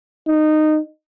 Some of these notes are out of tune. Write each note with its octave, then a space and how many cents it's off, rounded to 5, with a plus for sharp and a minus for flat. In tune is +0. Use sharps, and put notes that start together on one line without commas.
D#4 -15